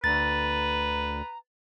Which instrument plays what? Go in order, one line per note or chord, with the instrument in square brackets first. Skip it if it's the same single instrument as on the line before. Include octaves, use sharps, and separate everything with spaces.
[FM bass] D2 [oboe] B4 [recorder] A#5 [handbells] A6